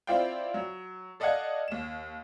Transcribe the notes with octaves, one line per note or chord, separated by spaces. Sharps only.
C4 E4 F4 D5 F5 G5
F#3
A4 D5 D#5 F5 F#5 G#6
D#2 E7